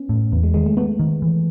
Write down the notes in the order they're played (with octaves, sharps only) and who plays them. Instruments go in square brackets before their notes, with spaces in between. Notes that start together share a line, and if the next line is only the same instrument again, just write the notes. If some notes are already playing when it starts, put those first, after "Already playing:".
Already playing: [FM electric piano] B3 C#4
[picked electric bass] A2
[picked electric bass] E2 [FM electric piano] B3
[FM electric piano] G#3
[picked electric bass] D#3 [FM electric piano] G#3
[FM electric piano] A3
[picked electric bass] A3 [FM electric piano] B3
[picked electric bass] D#3
E3